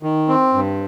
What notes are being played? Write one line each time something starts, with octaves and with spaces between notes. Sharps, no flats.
D#3
C4
G2